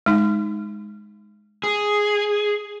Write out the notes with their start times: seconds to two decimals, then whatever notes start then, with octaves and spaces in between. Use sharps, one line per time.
0.06 G#3 D#4
1.64 G#4